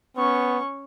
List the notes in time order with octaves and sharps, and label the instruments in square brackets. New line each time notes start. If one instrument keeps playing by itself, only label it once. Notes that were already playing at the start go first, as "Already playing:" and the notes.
[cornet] B3 [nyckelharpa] C#4 C#6